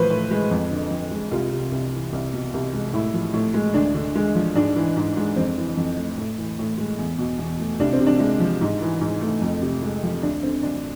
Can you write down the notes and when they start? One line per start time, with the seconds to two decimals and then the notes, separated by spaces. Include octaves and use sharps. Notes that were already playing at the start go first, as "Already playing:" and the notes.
Already playing: A2 F3 B4 C5
0.10 A2
0.31 G#3
0.51 F2
0.71 D3
0.90 F2
1.11 G#3
1.31 C2 F4
1.52 C3
1.71 C2
1.93 E3
2.13 C2
2.33 B2
2.54 C2
2.73 G#3
2.93 A2 E4
3.14 F3
3.33 A2
3.54 G#3
3.74 D2 D4
3.94 D3
4.15 G#3
4.35 F3
4.55 G#2 D4
4.76 E3
4.96 G#2
5.17 G#3
5.36 F2 C4
5.57 E3
5.77 F2
5.97 A3
6.17 A2
6.38 E3
6.59 A2
6.78 G#3
6.98 E2
7.19 B2
7.39 E2
7.59 A3
7.80 C2 D4
7.93 C4
7.99 C3
8.07 D4
8.20 G#3
8.40 F3
8.61 G#2
8.81 E3
9.01 G#2
9.21 A3
9.42 F2
9.62 C3
9.83 G#3
10.03 F3
10.23 D2 D4
10.43 D3 C4
10.63 D2 D4